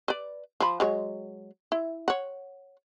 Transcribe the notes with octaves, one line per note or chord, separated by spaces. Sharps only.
B4 D5
F3 B5
F#3 G#3 C#5
E4
C#5 F#5